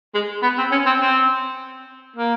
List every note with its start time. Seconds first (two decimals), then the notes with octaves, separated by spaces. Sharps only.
0.14 G#3
0.43 B3
0.58 C4
0.72 C#4
0.86 C4
1.01 C4
2.16 A#3